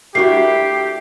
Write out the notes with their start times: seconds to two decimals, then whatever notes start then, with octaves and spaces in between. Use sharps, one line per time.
0.15 A3 D4 E4 F#4 G4 A#4 C7